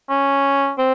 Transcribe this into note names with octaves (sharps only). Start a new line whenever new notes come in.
C#4
C4